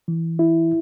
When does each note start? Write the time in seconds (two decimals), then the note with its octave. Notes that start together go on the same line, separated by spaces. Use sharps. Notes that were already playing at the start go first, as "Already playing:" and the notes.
0.08 E3
0.39 E4